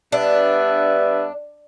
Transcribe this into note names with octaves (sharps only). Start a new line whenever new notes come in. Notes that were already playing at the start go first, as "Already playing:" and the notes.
G2 B3 D4 E5